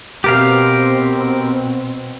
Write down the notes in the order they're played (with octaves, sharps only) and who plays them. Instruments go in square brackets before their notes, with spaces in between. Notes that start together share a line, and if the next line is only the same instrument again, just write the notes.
[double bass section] B2 C4 [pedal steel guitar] G4 A#4 F5